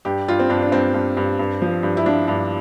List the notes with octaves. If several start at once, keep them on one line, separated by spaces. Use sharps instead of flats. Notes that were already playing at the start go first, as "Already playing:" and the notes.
G2 G4
G2 F4
C4
G2 D4
D4
G2 C4
G2
G2
G2
F3
G2
E4
F3 D4
G2